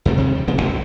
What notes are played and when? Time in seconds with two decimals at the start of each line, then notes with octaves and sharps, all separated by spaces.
0.05 D#2 C3 G3
0.18 C3 D#3 F3 G#3
0.35 G3
0.48 D#1 C#3 B3 C4
0.61 B1